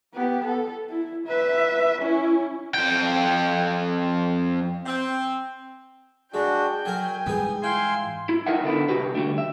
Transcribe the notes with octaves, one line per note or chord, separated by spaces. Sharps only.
B3 G4
A4
E4
B4 E5
C#4 E4
F2 G5
C4
G#3 D4 F#4 G5
F#3 A#4 G#5
G#2 E3 G3 B3 G#4
E4 F5 G5 G#5 C6
E4
D#4 E4 A#4 D#5 E5 F#5
D3 B3 D4 E4
C2 F#4 G4 B4
D3 G3 A3 D4
E5